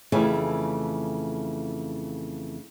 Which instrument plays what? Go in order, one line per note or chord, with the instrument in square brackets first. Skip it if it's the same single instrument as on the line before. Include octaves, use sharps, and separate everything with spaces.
[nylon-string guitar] F2 C#3 E3 A3 C#5 G#5